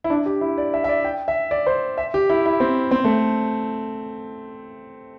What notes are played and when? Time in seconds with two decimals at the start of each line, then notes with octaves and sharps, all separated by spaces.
0.04 E4
0.10 D4
0.26 G4
0.41 E4
0.58 D5
0.74 E5
0.84 E5
0.89 D5
1.05 G5
1.28 E5
1.51 D5
1.67 C5
1.98 E5
2.14 G4
2.30 E4
2.46 E4
2.60 C4
2.91 C4
3.04 A3